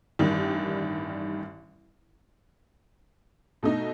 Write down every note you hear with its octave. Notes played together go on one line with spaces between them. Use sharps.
A1 G2 D#3 G3
B2 A3 D#4